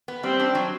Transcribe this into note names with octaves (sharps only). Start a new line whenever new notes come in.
B3
G3 C4
D4
F#3